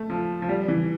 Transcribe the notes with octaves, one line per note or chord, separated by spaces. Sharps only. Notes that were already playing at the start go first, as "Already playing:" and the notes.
Already playing: A3
F3
F3
G3
E3